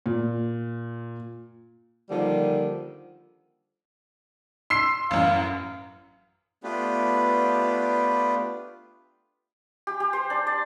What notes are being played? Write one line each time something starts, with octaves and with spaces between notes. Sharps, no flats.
A#2
D3 D#3 F3 G3 A#3
C6 E6 C7
A1 F#2 F5
A3 B3 D4 F4 G4 B4
G4
G4
C5
D4
D5